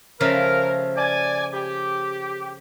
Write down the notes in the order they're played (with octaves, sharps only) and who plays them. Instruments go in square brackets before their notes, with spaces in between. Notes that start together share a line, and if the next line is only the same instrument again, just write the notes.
[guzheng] C#3 F3 A3 [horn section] A#4
[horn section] D5 G#5
G4